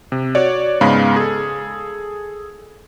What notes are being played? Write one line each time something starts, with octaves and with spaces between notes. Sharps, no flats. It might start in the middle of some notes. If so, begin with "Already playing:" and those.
C3
F#4 C#5 D5
G#2 C#3 G#3 B3 F5 B5
G#4 A4